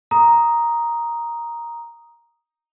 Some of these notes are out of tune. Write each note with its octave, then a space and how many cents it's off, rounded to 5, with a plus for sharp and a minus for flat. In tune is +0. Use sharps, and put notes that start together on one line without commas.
A#5 +5 D#6 +0